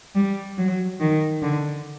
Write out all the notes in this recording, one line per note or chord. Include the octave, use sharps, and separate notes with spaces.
G3
F#3
D#3
D3